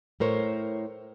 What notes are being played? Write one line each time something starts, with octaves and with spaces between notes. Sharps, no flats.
A2 A#4 C5 C#5